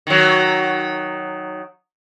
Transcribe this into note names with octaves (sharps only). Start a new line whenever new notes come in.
D#3 F#3